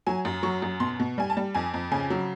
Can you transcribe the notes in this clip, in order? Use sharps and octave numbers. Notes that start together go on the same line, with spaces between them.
F#3 G#5
F#2
F#3 C#6
F#2
B2 C6
B2
G3 G#5
A5
G3
F2 G#5
F2
C#3 G#5
F#3